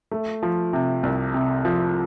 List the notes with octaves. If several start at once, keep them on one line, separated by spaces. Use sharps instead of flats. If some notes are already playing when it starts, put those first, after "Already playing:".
A3
F3
C3
C2
C3
F3